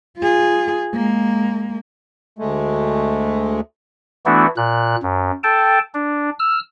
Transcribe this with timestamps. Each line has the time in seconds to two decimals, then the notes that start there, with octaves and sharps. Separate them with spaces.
0.18 F4 G#4
0.93 G#3 A#3
2.39 D2 G#3 A3
4.26 E3 A3 B3 D4 E4 F#4
4.57 A#2 F#6
5.03 F#2
5.43 A4 G5 A5
5.94 D4
6.39 E6 F6